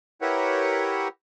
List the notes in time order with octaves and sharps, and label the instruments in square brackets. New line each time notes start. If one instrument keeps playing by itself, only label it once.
[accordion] E4 G4 A#4 B4 C#5 F#5